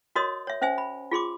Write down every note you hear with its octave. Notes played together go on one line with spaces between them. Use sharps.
F#4 A#4 C#5 D#5 C6 D#6
C#5 E5
C#4 C5 E5 G#5
B5
F4 G#4 C6 D6